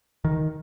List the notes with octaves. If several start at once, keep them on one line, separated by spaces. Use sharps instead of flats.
D#3